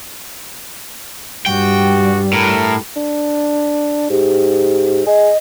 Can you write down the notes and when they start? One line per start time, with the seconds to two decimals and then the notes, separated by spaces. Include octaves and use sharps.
1.46 G2 G3 F#4 G5
2.33 A2 A#4
2.96 D4
4.10 G#2 G4
5.06 G#4 D#5